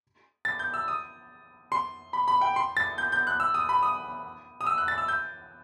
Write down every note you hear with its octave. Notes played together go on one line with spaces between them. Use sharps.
A6
G6
E6
D#6
C6
B5
B5
G5
C6
A6
G6
G6
F#6
E6
D#6
B5
D#6
D#6
E6
F#6
A6
E6
G6